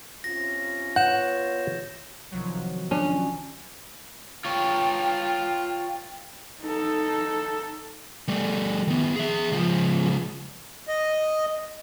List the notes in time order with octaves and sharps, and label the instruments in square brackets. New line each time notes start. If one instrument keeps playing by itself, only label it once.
[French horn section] C3 C#4 F4 [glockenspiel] A#6
[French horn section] B3 F4 C#5 [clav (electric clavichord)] F#5 [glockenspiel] G6 E7
[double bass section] C2 [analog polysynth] D#3 F3 F#3
[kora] C#4 [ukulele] D4
[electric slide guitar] F4 C#5 [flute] G5
[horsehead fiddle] D#4 A4
[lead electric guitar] G3 A3
D#3 B3
G#4 E5
C#2 F3
[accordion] D#5